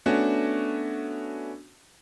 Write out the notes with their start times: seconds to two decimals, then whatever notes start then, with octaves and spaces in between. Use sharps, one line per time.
0.06 A3 B3 C#4 D4 F#4